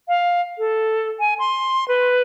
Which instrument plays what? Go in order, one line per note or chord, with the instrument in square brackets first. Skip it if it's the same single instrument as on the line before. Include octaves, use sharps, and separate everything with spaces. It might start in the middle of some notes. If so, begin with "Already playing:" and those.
[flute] F5
A4
G#5
C6
B4